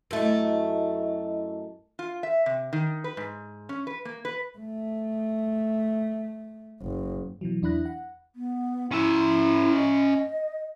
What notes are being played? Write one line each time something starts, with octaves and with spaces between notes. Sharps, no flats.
F#2 A3 E4 D#5
F4
E5
C3
D#3
B4
G#2
C#4
B4
A#3
B4
A3
F#1
B2 E3 F#3
E2 D4 E4 B5 F#6 A#6
F#5
B3
C#4 E4 E5
D#5